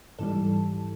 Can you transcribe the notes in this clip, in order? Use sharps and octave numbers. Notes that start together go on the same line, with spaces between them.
G#2 E3 G3 A4